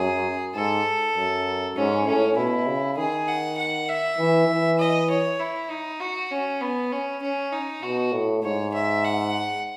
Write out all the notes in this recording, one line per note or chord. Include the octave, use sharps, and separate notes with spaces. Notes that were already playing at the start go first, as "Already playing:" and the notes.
Already playing: F#2 G#4
G#2 A4
F#2
G#2 C#4
A2 C#4
B2 E4
C#3
D#3 G#4
F#5
F#5
E5
E3
E3
D#5
C#5
E4
D#4
F#4
C#4
B3
C#4
C#4
D#4
B2 F#4
A2
G#2 C#5
E5
F#5